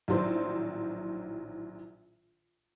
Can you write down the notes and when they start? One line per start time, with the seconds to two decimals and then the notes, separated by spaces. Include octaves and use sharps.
0.08 A#1 A2 D#3 F#3 C5 C6